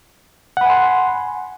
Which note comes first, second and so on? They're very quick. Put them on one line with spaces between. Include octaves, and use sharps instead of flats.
F#5 B5 G#5 C6